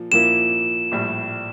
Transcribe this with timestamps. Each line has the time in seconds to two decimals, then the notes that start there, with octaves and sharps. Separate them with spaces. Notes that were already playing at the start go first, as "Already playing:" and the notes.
Already playing: A#2 F3
0.12 A#2 F3 A#3 E4 E7
0.91 A#1 A2 G3